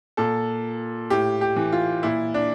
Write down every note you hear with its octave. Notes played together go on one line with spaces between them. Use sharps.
A#2 A4
A2 G4
G4
E3
F4
A#2 E4
D4